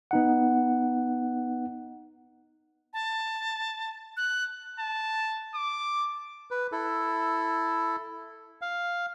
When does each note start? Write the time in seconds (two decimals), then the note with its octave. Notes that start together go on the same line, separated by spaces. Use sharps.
0.11 B3 D#4 F#5
2.93 A5
4.17 F#6
4.79 A5
5.55 D6
6.51 B4
6.72 E4 A4
8.62 F5